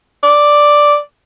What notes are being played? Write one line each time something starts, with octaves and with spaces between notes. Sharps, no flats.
D5